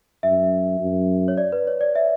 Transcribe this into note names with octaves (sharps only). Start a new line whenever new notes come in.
F#2 E5
F#2
C#5
D5
B4
C#5
D5
E5